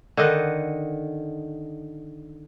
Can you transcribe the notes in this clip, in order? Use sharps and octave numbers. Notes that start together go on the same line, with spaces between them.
D3 D#3 D#5 F#5